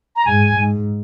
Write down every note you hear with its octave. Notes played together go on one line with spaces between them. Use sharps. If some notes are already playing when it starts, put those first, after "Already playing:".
A#5
G#2 G#5
G#2